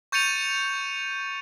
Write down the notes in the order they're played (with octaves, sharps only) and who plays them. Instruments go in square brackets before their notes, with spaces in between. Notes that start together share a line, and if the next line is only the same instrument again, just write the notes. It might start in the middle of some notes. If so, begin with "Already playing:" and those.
[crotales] C#6 G6 A6 C#7 D#7 F7